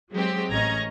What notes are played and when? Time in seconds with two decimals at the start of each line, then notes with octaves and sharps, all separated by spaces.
0.12 F#3 G#3 C4 G4
0.51 A1 C#4 D#5 A#5 G#6